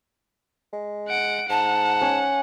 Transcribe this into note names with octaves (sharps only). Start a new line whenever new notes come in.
G#3
F#5 D7
G#2 F#5 A5
C#4